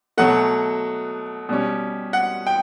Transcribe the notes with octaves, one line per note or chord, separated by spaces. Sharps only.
B2 F#3 A3 F#5
B2 G3 C#4
F#5
G5